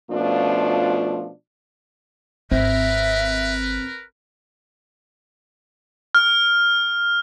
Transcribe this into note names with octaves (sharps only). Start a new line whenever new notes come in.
B2 F3 A3 C#4 D4 F4
G#1 C4 A#4 B4 E5
F6